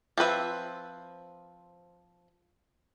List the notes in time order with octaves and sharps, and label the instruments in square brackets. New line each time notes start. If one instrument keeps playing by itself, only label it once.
[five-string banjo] F3 C4 B4 E5